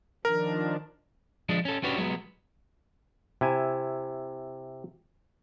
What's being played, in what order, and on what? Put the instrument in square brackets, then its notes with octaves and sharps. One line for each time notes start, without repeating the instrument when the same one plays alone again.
[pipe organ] D#3 F3 D4 [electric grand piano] A#4
[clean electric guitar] F3 G#3 D4
C#4 A4
C#4 D4 F#4 G4 B4 C#5
F#3 G#3 B3
[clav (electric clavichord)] C3 E4 G#5